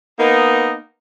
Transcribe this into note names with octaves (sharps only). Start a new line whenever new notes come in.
A#3 B3 D#4